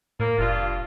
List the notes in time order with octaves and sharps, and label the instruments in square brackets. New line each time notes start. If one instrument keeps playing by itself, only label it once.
[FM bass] A2 [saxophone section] A#3
[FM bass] F1 [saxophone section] G2 F4